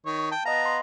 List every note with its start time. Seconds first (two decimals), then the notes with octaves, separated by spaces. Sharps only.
0.06 D#3 C#5
0.31 G5 A5
0.45 B3 D#5 F5 A#5
0.65 C6